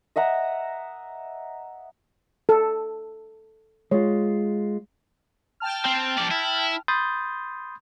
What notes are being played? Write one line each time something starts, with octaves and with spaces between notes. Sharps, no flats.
D#5 E5 F#5 A#5
A4
G#3 F4 C#5
G5 A5 F6
C4
F3 D5
E4
B5 C6 D#6 G6 A6